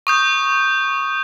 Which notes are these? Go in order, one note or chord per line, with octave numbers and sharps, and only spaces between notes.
C#6 D#6 G6